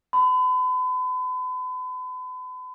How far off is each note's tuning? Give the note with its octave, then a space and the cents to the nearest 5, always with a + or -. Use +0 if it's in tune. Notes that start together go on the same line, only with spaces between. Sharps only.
B5 +40